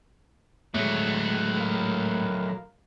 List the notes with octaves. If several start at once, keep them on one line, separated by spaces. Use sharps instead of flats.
A2 F#3 G#3 A3
A#4 F5